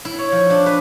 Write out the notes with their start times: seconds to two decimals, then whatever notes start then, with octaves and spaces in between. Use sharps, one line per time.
0.05 E4
0.19 C#5
0.32 F3
0.50 D4
0.66 B4